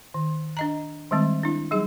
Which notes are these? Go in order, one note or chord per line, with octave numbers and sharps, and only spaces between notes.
D#3
D4 D#5 A#5
D#3 G3 G#3 C4
D4 E4
F#3 G3 D#4 G#4